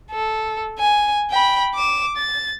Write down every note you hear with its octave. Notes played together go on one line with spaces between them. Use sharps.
A4
G#5
G5 B5
D6 E7
A6